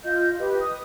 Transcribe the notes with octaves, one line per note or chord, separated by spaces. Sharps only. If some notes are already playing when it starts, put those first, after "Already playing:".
F4 D#5 G6
G4 B4 D#5
D#6